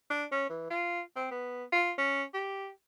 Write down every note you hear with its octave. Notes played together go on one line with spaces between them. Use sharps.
D4
C#4
E3
F4
C4
B3
F4
C#4
G4